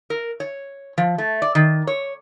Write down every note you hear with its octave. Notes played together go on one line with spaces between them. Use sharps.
A#4
C#5
F3
A3
D5
D#3
C#5